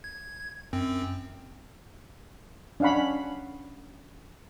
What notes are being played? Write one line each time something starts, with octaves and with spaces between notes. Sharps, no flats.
G#6
F#2 C4
C#4 D4 F5 F#5 B5